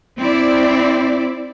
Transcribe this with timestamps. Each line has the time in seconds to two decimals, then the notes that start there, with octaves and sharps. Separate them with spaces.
0.19 C4 E4 D5